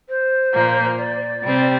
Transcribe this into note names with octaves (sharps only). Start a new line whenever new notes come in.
C5
A#2 F3 A#3
D5
C3 G3 C4